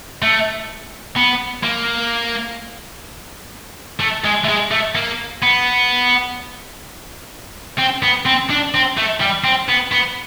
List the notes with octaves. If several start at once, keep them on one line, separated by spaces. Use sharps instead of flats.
A3
B3
A#3
A3
G#3
A3
G#3
A3
A#3
B3
C4
B3
C4
D4
C4
A3
G3
C4
B3
B3